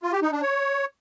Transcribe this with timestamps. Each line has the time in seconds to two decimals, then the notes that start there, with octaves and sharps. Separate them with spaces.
0.03 F4
0.13 G4
0.22 D#4
0.32 D4
0.42 C#5